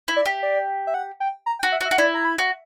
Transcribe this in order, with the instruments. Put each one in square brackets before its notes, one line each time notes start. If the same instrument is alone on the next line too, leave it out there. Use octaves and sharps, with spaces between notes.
[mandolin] E4
[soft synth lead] D5
[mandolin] G4
[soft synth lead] D5
E5
F#5
G5
A#5
G5
[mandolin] F#4
[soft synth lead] E5
[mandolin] F#4
[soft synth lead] E5
[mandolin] F#4
[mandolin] E4 [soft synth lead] D5
[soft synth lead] A#5
B5
[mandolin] F#4